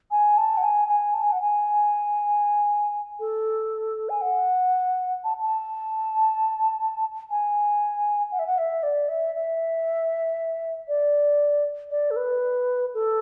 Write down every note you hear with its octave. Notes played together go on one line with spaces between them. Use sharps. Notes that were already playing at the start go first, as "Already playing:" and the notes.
G#5
A5
F#5
G#5
G#5
A5
G#5
F#5
G#5
A4
G#5
F#5
A5
A5
G#5
F#5
E5
F#5
E5
D5
E5
E5
D5
D5
A4
B4
A4